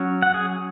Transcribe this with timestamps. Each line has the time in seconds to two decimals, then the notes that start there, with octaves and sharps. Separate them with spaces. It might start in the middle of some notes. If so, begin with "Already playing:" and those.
Already playing: F#3 C#4
0.22 F#5
0.34 G#4